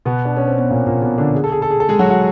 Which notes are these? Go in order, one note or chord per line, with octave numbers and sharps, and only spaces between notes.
B2 B3
D4
C#4
C4
B3
A#2 A#3
A#2 A#3
B2 B3
D3 D4
G#4
A4
G#4
A4
G#4
A4
G#3 G#4
F#3 F#4
F#4